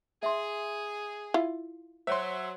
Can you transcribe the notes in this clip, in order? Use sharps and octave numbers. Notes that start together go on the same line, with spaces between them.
G#4 E5 C6
E4 F4
F#3 C5 C#5 E5 C6